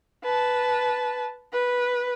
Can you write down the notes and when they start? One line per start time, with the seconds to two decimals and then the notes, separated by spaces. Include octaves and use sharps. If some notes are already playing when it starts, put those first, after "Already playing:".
0.24 B4 A5
1.53 B4